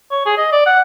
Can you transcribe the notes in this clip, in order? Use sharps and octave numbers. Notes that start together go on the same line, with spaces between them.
C#5
G#4
D#5
D5
F#5